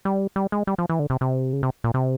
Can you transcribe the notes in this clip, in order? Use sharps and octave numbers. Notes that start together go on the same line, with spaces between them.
G3
G3
G#3
G3
F3
E3
D3
C3
C3
C#3
C3
A#2
C3